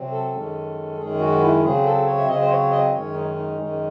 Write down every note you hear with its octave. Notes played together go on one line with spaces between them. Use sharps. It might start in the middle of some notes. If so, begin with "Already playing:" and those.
Already playing: C3 F#3 C4
A4
F#2 D#3 G#3 C#4
F#2 D#3 G#3 C#4 G#4
F#4
E4
C#3 F#3 C4 G#4
A4
C#5
E5
C#3 F#3 C4 D#5
C5
C#5
D#5
F#2 D#3 G#3 C#4 C#5
D#4
D#4
F#2 D#3 G#3 C#4